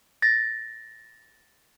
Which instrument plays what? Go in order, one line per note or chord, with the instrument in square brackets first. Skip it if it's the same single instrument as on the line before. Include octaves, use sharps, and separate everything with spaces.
[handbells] A6 A#6